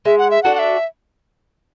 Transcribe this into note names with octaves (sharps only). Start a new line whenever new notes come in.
G#3 E5
F#5
E5
D4 F#4 A4 F#5
F#5
E5